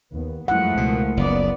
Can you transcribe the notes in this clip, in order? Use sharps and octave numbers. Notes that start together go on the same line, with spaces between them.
D#2 B3
F#2 F3 G#3 A3 E4 F#5
C#2 B2 A#3
F#1 F3 B3 D5